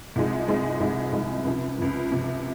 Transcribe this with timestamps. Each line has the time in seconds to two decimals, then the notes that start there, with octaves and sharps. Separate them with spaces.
0.16 C2 C3 F3 G#3 D#4
0.48 C2 C3 F3 G#3 D#4
0.80 C2 C3 F3 G#3 D#4
1.12 C2 C3 F3 G#3 D#4
1.45 C#2 C3 F3
1.78 C#2 C3 F3
2.11 C#2 C3 F3